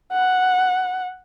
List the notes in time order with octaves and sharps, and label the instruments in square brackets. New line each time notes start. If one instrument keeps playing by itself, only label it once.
[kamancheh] F#5